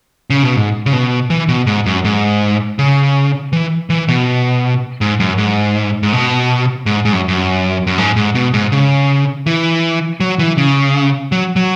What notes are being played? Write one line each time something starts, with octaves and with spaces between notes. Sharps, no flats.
C#3
B2
G#2
C#3
B2
E3
B2
G#2
F#2
G#2
C#3
E3
E3
B2
G#2
F#2
G#2
G#2
B2
G#2
G#2
F#2
F#2
F#2
G#2
G#2
B2
G#2
C#3
E3
F#3
E3
C#3
F#3
F#3